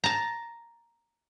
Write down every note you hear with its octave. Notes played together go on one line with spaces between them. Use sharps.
A5 A#5